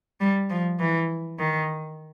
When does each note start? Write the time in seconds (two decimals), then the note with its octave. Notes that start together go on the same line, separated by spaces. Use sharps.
0.21 G3
0.50 F3
0.79 E3
1.39 D#3